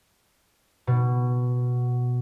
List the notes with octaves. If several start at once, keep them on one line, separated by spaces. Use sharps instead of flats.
B2